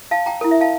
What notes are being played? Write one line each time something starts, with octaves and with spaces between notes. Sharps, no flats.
F5 A5
G5 A#5
E4 A#4
E5
F5 A5